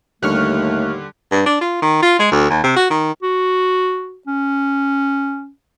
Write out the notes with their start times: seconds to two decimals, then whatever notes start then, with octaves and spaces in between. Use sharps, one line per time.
0.23 D#2 A2 D3 G3 A3 C#6 F6 F#6
1.31 G2
1.46 D4
1.61 F4
1.82 D#3
2.02 F4
2.19 G#3
2.32 D2
2.50 D#2
2.63 C3
2.76 F#4
2.90 D#3
3.23 F#4
4.27 C#4